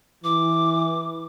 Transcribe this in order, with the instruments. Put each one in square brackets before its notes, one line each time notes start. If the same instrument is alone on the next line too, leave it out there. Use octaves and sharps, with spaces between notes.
[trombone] E3 [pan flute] D6